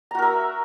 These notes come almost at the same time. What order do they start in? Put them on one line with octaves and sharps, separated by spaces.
A#5 F#4 A#4 E5